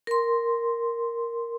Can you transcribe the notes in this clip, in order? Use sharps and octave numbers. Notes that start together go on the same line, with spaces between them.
A#4 C6